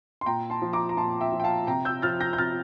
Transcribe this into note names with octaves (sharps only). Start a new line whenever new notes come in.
C6
A#2 G5 A#5
A5 C6
F3
A#5 D6
A#5
A#2 A5 C6
E5 G5
F3
G5
F5 A5
C3 G5 A#5
E6 G6
F3 F6 A6
G6 A#6
G6
C3 F6 A6